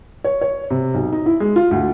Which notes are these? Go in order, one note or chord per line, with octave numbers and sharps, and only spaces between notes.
C#5
C#5
C3
B1
D#4
E4
G#3
F4
D2